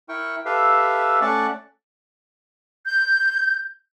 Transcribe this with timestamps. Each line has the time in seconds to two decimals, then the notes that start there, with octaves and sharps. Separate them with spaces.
0.09 E4 A#4 G5 C#6
0.46 G4 A4 B4 E5 F5
1.21 A3 C#4 D5 F#5 A5 C#6
2.86 G6